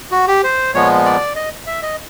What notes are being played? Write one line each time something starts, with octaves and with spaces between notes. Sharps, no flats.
F#4
G4
C5
A#2 F3 G#3 B3 C#5
D5
D#5
E5
D#5